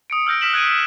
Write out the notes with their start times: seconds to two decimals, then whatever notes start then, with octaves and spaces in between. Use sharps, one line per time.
0.10 D#6 C#7 D7
0.27 E6 F6 G6 A#6 D7
0.41 E6 F6 B6 E7 F#7
0.53 F#6 G#6 D7 D#7